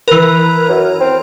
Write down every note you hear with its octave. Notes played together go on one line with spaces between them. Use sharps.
E3 A#4 B4
F#2
C4